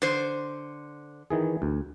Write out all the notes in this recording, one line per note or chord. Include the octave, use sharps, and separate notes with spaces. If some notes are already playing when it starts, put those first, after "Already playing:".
D3 C5
D#3 E3 G#4
D2